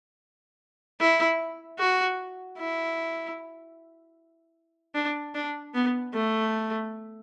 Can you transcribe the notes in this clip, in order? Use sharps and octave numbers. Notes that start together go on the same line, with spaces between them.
E4
F#4
E4
D4
D4
B3
A3